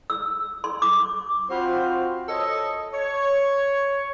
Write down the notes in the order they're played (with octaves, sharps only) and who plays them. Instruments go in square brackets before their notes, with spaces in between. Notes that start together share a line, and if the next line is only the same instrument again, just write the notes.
[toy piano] E6
C6
D6
[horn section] C4 F4 F#4 C5 B5
A4 C#5 D#5
C#5